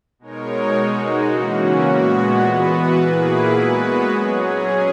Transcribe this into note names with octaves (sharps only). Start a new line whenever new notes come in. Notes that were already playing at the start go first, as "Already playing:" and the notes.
B2 G#3 D#4 A#4 C#5
G#3 D#4 F#4
C#3 E3 A#3 C#4 F#4
A#2 G#3 B3 F#4
E3 B3 F#4 B4
A#2 A#3 E4 G#4 B4
G#3 B3 F#4 B4
F#3 C#4 G#4